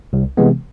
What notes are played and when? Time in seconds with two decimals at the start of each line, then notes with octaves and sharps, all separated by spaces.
0.13 C2
0.37 C3 E3 G#3 B3